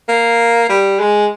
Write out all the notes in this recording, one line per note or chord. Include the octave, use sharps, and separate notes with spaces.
A#3
G3
G#3